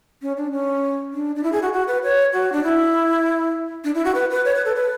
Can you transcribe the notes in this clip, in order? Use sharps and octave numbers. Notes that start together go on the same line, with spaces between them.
C#4
D4
C#4
D4
D4
E4
G#4
F#4
F#4
B4
C#5
F#4
D4
E4
D4
E4
F#4
B4
B4
C#5
B4
A4
B4